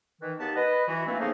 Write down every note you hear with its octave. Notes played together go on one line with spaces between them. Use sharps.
D#3 E3
D#2 B3 A5
B4 D#5
E3 F#4
D#3 E3 A3 A#3 C4 D4
A2 C#3 F3 A#3 B3 D#4